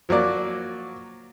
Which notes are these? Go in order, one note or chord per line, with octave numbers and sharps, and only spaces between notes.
F3 F#3 A#3 D5